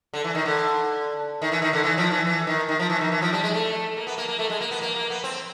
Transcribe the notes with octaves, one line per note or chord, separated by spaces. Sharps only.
D3
E3
D#3
D3
D#3
E3
D#3
D3
E3
F3
E3
E3
D#3
D#3
F3
E3
D#3
E3
F3
G3
G#3
A3
A#3
B3
A#3
A#3
A3
G#3
A#3
B3
A#3
A#3
B3
C4